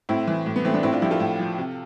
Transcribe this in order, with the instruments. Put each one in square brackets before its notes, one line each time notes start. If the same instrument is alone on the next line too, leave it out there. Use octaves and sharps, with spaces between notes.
[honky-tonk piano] A2 C4 E4
E3
A2
B3
E3 A3 C4
B3 D4
A2 C4 E4
D4 F4
F3 E4 G4
F4 A4
A2
F3
C3